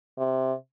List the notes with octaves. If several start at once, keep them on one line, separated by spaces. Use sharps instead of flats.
C3